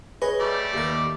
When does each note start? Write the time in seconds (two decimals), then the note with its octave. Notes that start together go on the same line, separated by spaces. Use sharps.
0.22 G#4 B4 C#5 D#5
0.40 G3 A3 D5
0.74 D#2 A#4